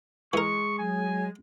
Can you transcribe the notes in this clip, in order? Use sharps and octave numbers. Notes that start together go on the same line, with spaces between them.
E3 G#3 A#4 C#6
F#3 G#5